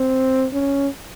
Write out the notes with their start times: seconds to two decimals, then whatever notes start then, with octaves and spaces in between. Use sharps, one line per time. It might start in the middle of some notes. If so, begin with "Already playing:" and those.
Already playing: C4
0.53 C#4